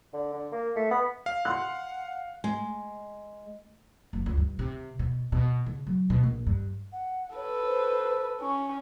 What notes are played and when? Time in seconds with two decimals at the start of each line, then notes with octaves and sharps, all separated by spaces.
0.13 D3
0.33 D3
0.52 A#3
0.75 A3
0.91 B3
1.26 F5
1.45 F#5 C6 F#6
2.44 G#3
4.13 F#1
4.26 C#2
4.38 G2
4.59 C3
4.99 B2
5.32 B2
5.66 C#3
5.87 F#3
6.10 B2
6.23 A#1
6.47 G2
6.92 F#5
7.36 A4 B4 C#5
7.66 C5
8.41 C#4 C#6